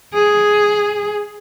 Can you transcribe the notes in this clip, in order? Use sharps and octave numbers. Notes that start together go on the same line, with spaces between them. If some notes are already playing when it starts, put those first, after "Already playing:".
G#4